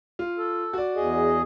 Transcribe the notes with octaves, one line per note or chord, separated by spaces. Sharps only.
F4
A4
F#4 D5
E2 G#4 D#5